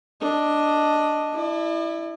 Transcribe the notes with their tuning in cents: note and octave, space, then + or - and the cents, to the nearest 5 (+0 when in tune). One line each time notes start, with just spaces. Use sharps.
D4 +0 D#5 +0
E4 +0 D5 +40